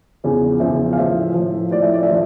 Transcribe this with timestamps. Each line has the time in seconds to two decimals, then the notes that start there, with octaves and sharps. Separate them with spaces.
0.24 E2 C#3 F3
0.60 E2 C#3 F3 E5
0.93 F5
0.97 A2 F3 E5
1.34 A2 F3
1.71 A2 F3 D5
1.82 E5
1.94 D5
2.03 E5
2.08 A2 F3